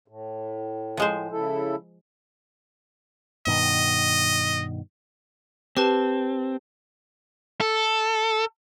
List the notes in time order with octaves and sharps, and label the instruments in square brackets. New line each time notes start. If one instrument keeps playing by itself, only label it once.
[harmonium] A2
[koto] F3 G#3 C5
[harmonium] C#3 E4 A4
[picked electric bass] G2 B2 D#3 [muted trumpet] D#5
[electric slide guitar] C4 [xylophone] G4 B4 A5
[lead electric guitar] A4